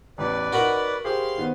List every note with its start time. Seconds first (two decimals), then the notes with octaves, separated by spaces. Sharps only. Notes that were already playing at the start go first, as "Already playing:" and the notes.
0.18 A1 E2 B4 D5
0.53 D#4 F#4 A#4 F#5 B5
1.05 G4 G#4 C5 F5 C6
1.38 D#3 B3 C4